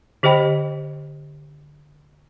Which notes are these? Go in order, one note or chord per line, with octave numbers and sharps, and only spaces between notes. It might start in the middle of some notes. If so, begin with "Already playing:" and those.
D3 G4 C5 D#5 G5 B5